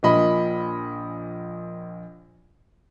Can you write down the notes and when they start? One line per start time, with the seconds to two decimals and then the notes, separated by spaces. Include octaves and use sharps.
0.03 A#1 A#2 D#5 B5